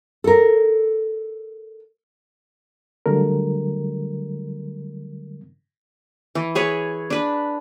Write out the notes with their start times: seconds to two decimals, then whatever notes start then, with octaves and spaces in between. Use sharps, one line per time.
0.24 A4 A#4
3.06 D3 F#3 G3 A3 A#4
6.35 E3
6.55 G#4 B4 C#5
7.10 D4 B4